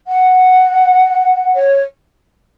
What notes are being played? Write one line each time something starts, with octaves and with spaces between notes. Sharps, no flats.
F#5
C#5